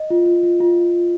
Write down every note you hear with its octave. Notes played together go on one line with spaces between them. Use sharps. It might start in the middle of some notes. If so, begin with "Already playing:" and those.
Already playing: D#5
F4
F4
F4
F4